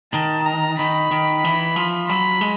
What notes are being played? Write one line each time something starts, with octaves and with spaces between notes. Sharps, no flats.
D#3 A5
A#5
D#3 B5
D#3
E3
F3
F#3 B5
G#3